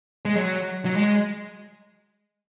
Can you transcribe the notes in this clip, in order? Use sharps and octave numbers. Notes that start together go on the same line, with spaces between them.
G#3
F#3
F#3
G#3